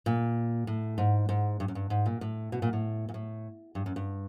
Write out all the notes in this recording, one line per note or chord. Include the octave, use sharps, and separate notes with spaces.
A#2
A2
G#2
G#2
G2
F#2
G2
G#2
A#2
A2
B2
A#2
A2
A#2
A2
G2
F#2
G2